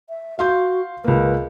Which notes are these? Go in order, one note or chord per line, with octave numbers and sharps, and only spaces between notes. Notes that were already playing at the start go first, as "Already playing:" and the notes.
E5
F#4 F5 C6 G6
C#2 A#3 B4